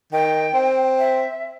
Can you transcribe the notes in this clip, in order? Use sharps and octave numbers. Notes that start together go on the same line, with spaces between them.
D#3 G5
C4
E5